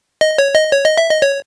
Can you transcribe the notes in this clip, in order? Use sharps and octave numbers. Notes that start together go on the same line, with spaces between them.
D#5
C#5
D#5
C#5
D#5
E5
D#5
C#5